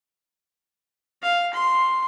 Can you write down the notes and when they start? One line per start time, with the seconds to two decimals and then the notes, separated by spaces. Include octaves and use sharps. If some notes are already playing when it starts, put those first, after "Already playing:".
1.23 F5
1.53 C6